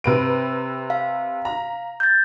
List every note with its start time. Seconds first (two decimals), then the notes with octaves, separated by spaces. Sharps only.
0.04 C3 B4 D7
0.90 F5
1.45 A#5
2.00 G6 A6